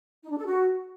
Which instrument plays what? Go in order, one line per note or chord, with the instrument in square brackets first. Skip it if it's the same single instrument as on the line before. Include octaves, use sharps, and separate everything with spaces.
[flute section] D#4
D4
A4
F#4